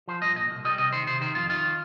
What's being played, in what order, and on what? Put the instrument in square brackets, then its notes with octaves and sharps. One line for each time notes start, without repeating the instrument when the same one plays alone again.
[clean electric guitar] F3 C5
G2 D#5
A#2 D#5
C2
G3 D#5
C3 D#5
D#3 C5
C3 C5
D#3 C5
F2 F4
D#3 F4